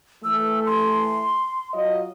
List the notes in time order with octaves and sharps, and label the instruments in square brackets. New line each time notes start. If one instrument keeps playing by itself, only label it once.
[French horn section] E3 A3 [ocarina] E6
[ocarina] C6
[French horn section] F#3 F4 D#5